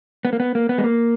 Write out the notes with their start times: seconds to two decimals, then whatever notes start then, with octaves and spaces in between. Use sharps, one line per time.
0.25 B3
0.33 A#3
0.40 B3
0.55 A#3
0.69 B3
0.78 G#3
0.84 A#3